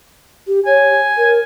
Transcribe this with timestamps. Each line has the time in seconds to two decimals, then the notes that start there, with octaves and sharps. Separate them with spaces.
0.47 G4
0.66 C#5 G#5
1.17 A#4